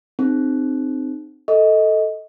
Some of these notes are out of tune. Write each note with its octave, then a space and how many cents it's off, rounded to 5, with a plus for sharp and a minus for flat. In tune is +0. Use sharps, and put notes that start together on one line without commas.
C4 +0 D#4 -30 G#4 +0
A4 +0 D#5 +20 C#6 +40